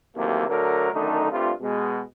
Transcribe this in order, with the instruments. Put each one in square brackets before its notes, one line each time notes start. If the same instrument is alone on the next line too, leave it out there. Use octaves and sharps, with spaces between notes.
[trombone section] D#2 C3 E3 F#3 A3 A#3
D3 F#3 A3 A#4
F#2 D3 D#3 A3 D#4
G2 G3 A3 C4 F4
B2 G#3